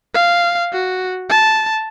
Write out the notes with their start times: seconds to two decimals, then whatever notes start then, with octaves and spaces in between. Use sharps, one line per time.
0.14 F5
0.72 F#4
1.29 A5